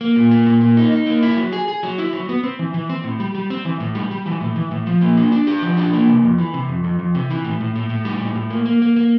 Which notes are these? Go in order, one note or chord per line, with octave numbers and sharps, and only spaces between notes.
A#3
A#2
A#3
A#2
A#3
D#4
D#4
A#3
E4
F#3
G#4
G#4
F#3
E4
F#3
B3
C4
E3
E3
C4
A2
G3
G3
C4
E3
A2
G3
G3
E3
A2
E3
A2
F3
A#3
D4
D4
G4
F3
D4
A#3
C3
F2
E3
C3
F2
F2
F2
C3
E3
A2
A2
A2
A2
G3
A2
A2
A#3
A#3
A#3
A#3